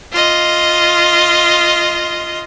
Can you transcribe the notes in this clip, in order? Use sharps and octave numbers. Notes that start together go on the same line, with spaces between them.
F4 D#5